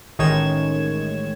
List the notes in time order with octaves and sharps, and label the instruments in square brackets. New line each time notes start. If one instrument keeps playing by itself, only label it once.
[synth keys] A1 D#3 G#3 C#5 G#6 E7